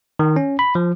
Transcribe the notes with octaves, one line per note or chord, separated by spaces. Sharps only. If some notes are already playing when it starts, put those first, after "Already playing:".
D#3
C#4
B5
F3